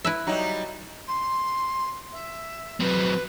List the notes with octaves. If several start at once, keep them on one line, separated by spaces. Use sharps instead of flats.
E4 B4 E5
F#3 G3 D#4
C6
E5
F#3 C4 B4